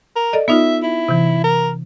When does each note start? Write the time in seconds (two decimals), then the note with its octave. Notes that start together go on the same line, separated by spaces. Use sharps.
0.16 A#4
0.33 A4 D5 D#5
0.48 B3 D#4 F4 E5
0.82 E4
1.08 C3 E3
1.44 A#4